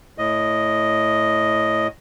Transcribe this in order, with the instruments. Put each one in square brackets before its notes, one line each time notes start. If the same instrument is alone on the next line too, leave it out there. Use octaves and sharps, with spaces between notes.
[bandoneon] A2 D#5